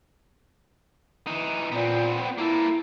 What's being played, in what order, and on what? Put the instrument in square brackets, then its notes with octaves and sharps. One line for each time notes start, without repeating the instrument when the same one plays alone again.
[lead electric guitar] E3 D#4
[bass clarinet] A#2 [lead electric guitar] B3 C4
[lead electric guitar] A#3 A4 [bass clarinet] E4